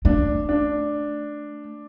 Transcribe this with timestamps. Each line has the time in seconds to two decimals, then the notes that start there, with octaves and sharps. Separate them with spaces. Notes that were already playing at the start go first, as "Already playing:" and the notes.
0.05 A3 D4
0.49 D4